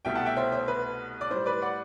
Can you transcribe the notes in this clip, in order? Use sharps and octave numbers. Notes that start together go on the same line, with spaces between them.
C2 B2 A3 E5 G5
F#5 A5
E5 G5
C5 E5
C5
B4
D5
A2 G3 C5
B4 D5
D5 F#5